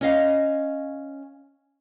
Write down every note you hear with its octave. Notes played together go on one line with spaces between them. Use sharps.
C#4 D#5 F5